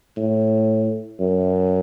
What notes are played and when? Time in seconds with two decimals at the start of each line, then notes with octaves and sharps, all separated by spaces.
0.17 A2
1.20 F#2